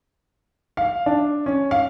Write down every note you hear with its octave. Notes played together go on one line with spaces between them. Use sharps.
F5
D4
C#4
F5